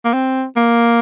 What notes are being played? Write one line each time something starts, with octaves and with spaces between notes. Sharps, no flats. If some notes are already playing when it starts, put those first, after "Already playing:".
A#3
C4
A#3